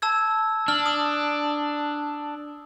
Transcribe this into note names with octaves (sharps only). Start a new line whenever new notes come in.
A5 E6 G#6
D4 F6
D#6